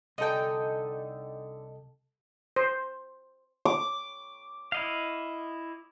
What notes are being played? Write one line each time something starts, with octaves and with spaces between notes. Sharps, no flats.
C2 D3 D#4 A4 D#5 G5 G#5
C5
D6
E4 D#5 F5